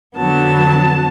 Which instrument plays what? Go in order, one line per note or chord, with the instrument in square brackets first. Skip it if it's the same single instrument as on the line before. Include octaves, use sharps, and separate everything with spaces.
[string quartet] F2 D3 F#3 B3 A5